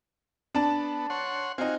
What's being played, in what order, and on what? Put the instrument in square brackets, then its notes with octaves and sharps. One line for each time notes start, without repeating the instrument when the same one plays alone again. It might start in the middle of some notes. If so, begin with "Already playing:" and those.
[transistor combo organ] B3 [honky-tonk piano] D4 A5
[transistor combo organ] C#5 F#5 C6
[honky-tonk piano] C4 D#4 [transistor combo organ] F4 F#4 G#5